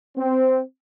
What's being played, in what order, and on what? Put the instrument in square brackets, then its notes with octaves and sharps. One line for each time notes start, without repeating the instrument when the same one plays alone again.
[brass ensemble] C4